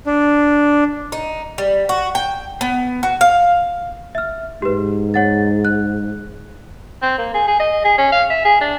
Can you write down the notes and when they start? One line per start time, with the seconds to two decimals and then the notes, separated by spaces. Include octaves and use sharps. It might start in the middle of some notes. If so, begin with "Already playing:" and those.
0.06 D4
1.12 D#4
1.58 G3
1.89 F#4
2.15 G5
2.61 B3
3.03 F#4
3.21 F5
4.15 E5 F6
4.62 G#2 G4 B4
5.14 C#5 F#5 A6
5.65 F#6
7.02 C4
7.18 A#3
7.34 G#4
7.47 G#4
7.60 D#5
7.84 G#4
7.98 C#4
8.12 F5
8.30 E5
8.45 G#4
8.61 D4